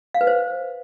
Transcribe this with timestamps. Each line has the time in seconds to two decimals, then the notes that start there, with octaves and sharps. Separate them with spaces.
0.14 F5
0.21 B4
0.27 C5